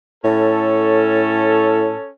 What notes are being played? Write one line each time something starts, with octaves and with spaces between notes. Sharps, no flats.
A2 C#4 A4